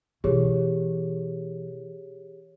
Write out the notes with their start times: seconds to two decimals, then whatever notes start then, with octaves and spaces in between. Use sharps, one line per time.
0.24 B2 E3 G4 G#4 C#5